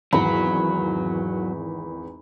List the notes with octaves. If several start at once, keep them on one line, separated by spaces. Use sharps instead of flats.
G#1 E2 F#3 B5